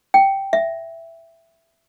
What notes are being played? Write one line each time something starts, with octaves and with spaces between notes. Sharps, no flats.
G5
E5